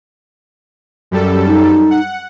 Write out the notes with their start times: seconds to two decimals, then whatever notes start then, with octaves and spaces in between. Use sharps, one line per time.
1.11 F#2 G3 A4
1.47 D#4
1.90 F#5